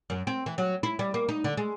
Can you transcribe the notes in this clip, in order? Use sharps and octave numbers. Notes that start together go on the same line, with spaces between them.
F#2
C4
E3
F#3
E4
G3
A#3
D#4
D3
G#3